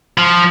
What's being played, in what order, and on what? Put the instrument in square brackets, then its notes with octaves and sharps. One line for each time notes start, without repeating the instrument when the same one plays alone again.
[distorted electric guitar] F3